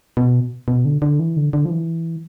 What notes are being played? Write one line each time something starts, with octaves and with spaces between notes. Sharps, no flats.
B2
B2
D3
D3
E3
D3
D3
F3
E3